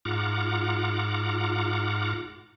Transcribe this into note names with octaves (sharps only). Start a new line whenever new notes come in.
G#2 F4 F#5 A#5 D6